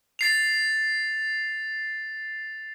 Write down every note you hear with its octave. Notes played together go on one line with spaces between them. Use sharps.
A6 C7 F7